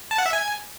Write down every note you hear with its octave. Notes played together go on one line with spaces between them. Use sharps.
A5
F#5
E5
G#5